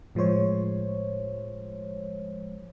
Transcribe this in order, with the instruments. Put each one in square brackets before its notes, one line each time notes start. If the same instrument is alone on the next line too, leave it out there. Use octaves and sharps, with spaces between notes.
[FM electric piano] A2 F3 G#3 C5 C#5